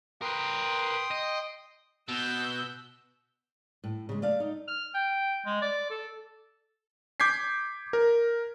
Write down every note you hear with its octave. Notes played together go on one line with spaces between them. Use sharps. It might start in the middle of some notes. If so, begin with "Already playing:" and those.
A#4 B4 G5 C6 D#6
D#5
B2 E6 F#6 G6
A2
C#3 G#3
A3 D5 F5
D#4
F6
G5
G#3
D5
A4
D6 G6 G#6 B6 C7
A#4